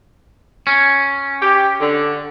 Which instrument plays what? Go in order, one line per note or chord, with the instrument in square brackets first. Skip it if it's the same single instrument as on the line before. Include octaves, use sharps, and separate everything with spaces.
[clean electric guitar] C#4
[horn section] G4
D3